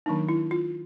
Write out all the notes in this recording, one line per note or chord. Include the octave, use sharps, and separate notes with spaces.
D#3 F#3 A#3 D4 D#4
E4
F4